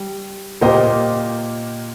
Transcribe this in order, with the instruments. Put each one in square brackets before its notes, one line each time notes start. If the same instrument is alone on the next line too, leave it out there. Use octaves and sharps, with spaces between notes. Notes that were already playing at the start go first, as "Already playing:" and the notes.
Already playing: [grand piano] G3
A#2 A#3 G4 C5 D#5